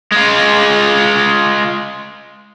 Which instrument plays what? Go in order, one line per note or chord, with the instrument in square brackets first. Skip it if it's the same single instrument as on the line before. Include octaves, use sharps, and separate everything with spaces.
[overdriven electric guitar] G#3 F4